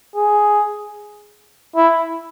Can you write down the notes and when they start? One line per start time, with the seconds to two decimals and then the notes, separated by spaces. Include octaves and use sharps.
0.16 G#4
1.76 E4